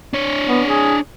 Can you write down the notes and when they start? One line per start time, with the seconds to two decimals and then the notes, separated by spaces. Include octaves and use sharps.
0.13 D4 C#5
0.48 B3
0.66 G#4